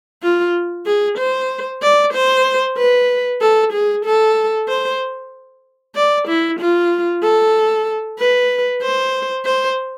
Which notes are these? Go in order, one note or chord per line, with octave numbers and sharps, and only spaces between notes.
F4
G#4
C5
D5
C5
B4
A4
G#4
A4
C5
D5
E4
F4
A4
B4
C5
C5